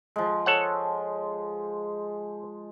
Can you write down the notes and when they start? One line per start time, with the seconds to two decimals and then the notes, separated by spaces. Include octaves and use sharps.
0.16 F3 G#3
0.46 A4 C#5 F#5